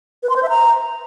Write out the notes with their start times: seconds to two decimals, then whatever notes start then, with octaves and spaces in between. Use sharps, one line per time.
0.23 B4
0.30 C6
0.36 C5
0.43 E5
0.49 A#5